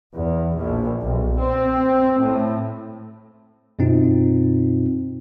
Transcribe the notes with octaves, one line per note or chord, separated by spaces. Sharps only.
E2
A#1
B1
C4
A2
F#2 B2 C4 D#4 F4